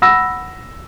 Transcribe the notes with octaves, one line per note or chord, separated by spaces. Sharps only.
F#5 B5 E6 A#6